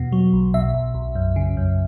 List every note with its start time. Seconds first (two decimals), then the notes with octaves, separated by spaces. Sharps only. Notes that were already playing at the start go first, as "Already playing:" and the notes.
Already playing: E2 B2
0.12 F#3
0.33 B1
0.54 B2 E5
0.74 B1
0.94 B1
1.15 F#2
1.36 C#3
1.57 F#2